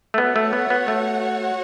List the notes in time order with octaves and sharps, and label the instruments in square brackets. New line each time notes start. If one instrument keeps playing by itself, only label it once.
[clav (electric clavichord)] A3
[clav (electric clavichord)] B3 [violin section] F#4 C#5 F#5
[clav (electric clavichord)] A3
B3
B3
A3